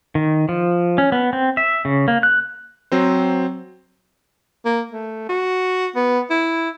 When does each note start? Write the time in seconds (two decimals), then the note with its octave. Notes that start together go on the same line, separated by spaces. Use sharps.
0.15 D#3
0.49 F3
0.98 C#4
1.12 B3
1.33 C4
1.57 E5
1.85 C#3
2.08 A#3
2.23 F#6
2.92 F#3 C4 C5
4.65 A#3
4.91 A3
5.29 F#4
5.96 B3
6.30 E4